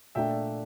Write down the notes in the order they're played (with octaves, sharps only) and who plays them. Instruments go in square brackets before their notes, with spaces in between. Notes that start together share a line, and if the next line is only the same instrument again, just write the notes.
[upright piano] A#2 A3 D4 E5 G5